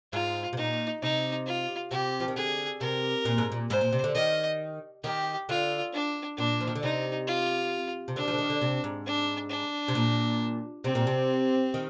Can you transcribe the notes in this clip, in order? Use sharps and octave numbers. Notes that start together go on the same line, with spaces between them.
G#2 F4
C3
A#2 D#4
C3 D#4
F4
C3 G4
F3
D#3
D3 G#4
C3 A#4
A#2
G#2
A#2
G#2 C5
A#2
C3
D3
D#3 D#5
D#3 G4
D3 F4
D4
A#2 D4
F3
D#3
D3
C3 D#4
F4
C3
D3 D4
D#3
F3
D3
D#3
D3
C3
G#2
D4
D4
C3
A#2
C3 C4
A#2
C3
D#3